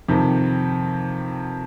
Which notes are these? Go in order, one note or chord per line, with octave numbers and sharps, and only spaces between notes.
F2 C3 D#3